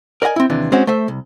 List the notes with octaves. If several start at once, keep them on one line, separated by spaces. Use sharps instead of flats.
A#4 D5 D#5 F#5 G#5
C4 E4
D#2 C3 E3 D4
G#3 C4 C#4 F#4
A3 C5 E5
C2